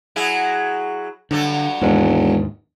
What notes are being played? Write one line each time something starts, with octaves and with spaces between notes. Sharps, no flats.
F#3 E4 G#4
G2 D3 F#3 A4
E1 D#2 G#2